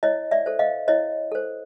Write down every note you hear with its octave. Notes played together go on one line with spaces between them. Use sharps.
E4 C#5 D#5
D5 E5
A4 C5
D#5 F5
E4 C#5 D#5
A4 C5